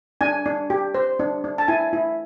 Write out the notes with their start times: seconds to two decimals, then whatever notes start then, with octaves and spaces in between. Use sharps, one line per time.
0.21 D4 G#5
0.46 D4
0.70 G4
0.94 C5
1.19 D4
1.44 D4
1.58 A5
1.68 E4 G#5
1.93 E4